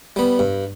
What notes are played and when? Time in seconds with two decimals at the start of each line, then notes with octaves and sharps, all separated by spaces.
0.16 G3 B3
0.39 G2